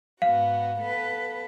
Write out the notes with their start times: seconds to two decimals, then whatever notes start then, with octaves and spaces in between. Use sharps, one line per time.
0.22 G#2 B3 F#4 F5
0.79 B3 A4 B4